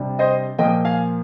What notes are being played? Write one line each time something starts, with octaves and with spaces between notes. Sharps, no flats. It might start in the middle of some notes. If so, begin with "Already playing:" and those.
Already playing: C3 G3 D4
C5 D#5
A#2 F3 A#3 D#5 G5
F5 G#5